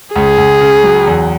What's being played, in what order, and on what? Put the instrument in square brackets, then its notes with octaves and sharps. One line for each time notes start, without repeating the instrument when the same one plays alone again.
[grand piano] C#2 [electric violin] G#4
[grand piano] C#2
C#3
F#3
E2